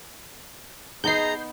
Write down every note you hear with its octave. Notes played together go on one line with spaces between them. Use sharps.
B3 D#4 G#4 D#5 A#5 G6 C7